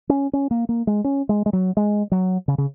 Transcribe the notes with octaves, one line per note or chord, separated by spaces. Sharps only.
C#4
C#4
A#3
A#3
G#3
C#4
G#3
G#3
F#3
G#3
F#3
C#3
C#3